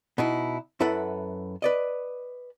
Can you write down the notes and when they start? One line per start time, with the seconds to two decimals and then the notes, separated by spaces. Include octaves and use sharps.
0.18 B2 D#4 E4
0.80 F#2 E4 A4 B4 F#5
1.62 B4 D5 D#5